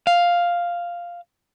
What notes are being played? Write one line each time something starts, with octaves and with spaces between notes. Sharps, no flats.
F5